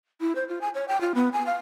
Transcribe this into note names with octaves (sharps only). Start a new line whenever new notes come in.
E4
C5
F4
G#5
C#5
G5
F4
B3
G#5
F5